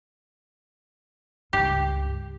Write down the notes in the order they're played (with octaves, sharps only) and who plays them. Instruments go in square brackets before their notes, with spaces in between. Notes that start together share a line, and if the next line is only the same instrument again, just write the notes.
[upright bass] C#2 G2 [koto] G4